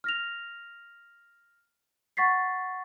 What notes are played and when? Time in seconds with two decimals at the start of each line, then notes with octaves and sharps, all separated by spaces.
0.04 F6 A#6 F7
2.17 F#5 C#6 A6 B6 C7